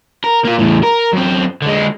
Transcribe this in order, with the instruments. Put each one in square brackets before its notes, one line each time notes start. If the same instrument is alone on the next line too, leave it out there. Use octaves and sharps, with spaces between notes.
[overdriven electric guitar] A#4
A#3 F4
E2 A2
A#4
F#2 C4
D3 G#3